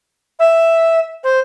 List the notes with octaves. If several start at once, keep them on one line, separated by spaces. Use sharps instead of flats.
E5
C5